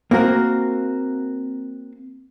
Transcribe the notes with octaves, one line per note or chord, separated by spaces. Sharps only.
A#3 C4 F#4 A#4